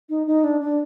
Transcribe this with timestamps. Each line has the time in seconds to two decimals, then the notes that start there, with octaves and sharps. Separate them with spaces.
0.10 D#4
0.27 D#4
0.44 D4
0.61 D4